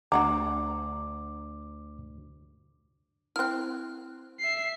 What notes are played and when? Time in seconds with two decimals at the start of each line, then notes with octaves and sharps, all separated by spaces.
0.12 D2 D4 F#4 A#5 D6
3.36 C4 E4 F6 F#6
4.40 E5 C7